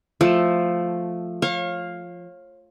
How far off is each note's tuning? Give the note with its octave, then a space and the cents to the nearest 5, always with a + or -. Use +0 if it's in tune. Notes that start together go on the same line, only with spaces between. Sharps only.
F3 +0 A3 +0
C#5 -35 F5 +5 C#6 -35